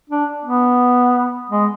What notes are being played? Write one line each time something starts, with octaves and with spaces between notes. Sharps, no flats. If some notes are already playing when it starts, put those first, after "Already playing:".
D4
B3
G#3